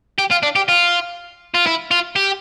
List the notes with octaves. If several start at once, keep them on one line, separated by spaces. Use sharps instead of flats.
G4
F4
D4
G4
F4
F4
E4
F4
G4